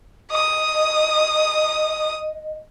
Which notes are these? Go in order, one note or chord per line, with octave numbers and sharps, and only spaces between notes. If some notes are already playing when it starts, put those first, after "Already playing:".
D#5 D#6